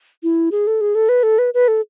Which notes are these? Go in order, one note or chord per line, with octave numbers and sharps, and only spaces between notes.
E4
G#4
A4
G#4
A4
B4
A4
B4
B4
A4